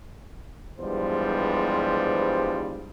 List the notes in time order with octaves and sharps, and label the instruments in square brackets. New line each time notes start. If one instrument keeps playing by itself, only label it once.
[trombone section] E2 G2 F3 G3 G#3 C5